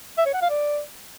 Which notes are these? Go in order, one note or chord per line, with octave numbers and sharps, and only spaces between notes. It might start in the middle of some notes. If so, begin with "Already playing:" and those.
E5
C#5
F#5
F5
D5